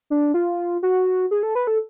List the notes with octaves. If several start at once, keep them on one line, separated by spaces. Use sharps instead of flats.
D4
F4
F#4
G#4
A4
B4
A4